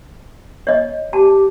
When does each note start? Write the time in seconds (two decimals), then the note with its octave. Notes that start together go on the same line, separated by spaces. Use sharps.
0.67 C#5 D#5
1.13 G4 A5